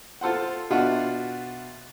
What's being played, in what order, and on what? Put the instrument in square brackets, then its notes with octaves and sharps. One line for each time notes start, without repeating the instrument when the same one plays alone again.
[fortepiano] F4 A4 C5 F#5
B2 D4 F4 F#4 E5 F#5